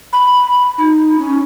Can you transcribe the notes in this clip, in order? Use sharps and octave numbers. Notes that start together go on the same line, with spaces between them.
B5
D#4
C#4